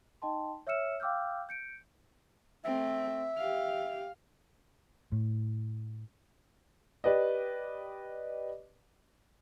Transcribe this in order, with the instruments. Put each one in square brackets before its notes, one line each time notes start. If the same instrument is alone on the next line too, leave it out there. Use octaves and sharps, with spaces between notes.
[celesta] D#4 D#5 G5 A5 C6
C#5 E5 E6 F6 C#7 E7
F5 G5 D6 E6 F6 G6
G6 C#7 D7
[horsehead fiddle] A3 C4 [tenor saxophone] E5
[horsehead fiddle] G4 F5
[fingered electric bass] A2
[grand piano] G4 B4 D5 D#5